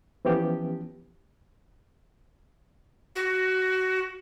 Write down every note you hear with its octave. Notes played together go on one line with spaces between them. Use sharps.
E3 F3 B3 C#4 G4
F#4